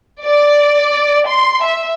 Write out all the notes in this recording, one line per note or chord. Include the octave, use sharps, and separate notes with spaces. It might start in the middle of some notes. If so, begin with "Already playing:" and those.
D5
C6
E5